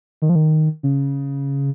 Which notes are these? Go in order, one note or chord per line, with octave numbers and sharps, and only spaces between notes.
D#3
F3
D#3
C#3